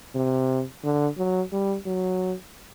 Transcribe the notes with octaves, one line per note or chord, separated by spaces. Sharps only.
C3
D3
F#3
G3
F#3